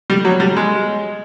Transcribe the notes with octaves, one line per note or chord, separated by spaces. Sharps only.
G3
F#3
G3
G#3